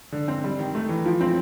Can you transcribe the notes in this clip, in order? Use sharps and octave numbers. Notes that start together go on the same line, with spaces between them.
D3
C4
G3
D#3
A3
E3
F3
C4